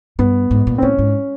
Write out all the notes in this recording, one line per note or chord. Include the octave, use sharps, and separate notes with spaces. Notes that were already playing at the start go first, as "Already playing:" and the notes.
G2 B3
G#2
A#2
C4
A2 C#4
G#2